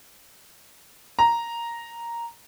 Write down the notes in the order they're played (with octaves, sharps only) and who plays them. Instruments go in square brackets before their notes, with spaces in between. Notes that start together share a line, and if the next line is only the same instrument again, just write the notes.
[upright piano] A#5